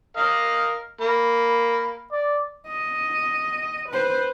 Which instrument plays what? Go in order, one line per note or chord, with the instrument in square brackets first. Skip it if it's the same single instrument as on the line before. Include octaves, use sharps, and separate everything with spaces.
[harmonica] A#4 D#5 F5
[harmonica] A#3 [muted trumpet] B5
[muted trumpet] D5
[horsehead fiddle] D#5
B4 C5